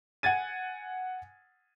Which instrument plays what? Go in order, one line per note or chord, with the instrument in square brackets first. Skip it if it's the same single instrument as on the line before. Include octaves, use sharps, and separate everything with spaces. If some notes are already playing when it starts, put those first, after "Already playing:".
[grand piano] F#5 G#5 G#6 A6 D#7